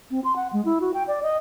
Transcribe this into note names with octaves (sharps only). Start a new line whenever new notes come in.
C4
C6
F#5
G#3
E4
F#4
G5
D5
D#5